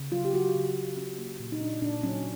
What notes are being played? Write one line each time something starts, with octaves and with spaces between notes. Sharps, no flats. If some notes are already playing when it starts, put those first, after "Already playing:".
Already playing: C#3
F#3 F4
G4
F#3 F#4
C#3
C#3
C#4
A#3
A#2
D#4
A#2 D4
A#2 D4
F#3 C#4